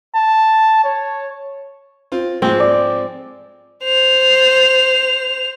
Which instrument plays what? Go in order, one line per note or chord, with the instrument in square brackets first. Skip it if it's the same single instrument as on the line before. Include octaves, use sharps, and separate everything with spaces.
[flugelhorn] A5
C#5
[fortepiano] C4 F4
[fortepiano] G#2 F3 G#3 [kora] C4
[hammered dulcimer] D5
[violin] C5 F7